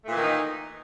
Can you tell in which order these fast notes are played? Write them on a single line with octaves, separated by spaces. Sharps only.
A3 A#2 E3 D#3 D#4